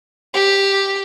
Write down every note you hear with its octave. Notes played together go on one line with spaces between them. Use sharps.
G4